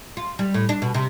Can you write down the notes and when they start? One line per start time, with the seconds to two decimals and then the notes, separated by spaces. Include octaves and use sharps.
0.17 F4
0.39 G3
0.54 A2
0.69 D4
0.82 B2
0.94 C3